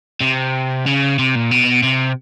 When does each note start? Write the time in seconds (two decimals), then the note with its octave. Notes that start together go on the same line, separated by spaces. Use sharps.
0.22 C3
0.86 C#3
1.19 C3
1.35 A#2
1.51 B2
1.83 C3